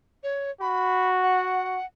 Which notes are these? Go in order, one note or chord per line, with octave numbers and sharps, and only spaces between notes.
C#5
F#4 B5
F#5